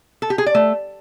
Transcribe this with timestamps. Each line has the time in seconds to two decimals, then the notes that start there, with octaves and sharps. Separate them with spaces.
0.22 A4
0.30 G4
0.38 G#4
0.46 D5
0.55 A3